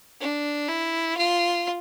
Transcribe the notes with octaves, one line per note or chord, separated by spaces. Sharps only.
D4
E4
F4